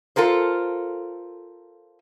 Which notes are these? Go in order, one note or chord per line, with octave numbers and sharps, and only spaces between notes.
F4 A4 A#4 C5